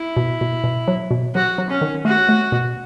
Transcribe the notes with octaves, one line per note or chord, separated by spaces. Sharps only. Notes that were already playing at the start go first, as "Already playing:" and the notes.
Already playing: E4
B2
B2
B2
F#3
B2
F#3 F#4
F#3
C#4
D#3
A3 F#4
A3
B2